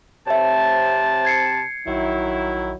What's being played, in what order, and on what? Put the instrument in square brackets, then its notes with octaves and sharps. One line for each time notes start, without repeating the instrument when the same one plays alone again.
[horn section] C3 C4 A5 [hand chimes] C#5 E5
[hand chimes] G#6 C7 C#7
[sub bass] A#1 [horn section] D#3 F#3 E4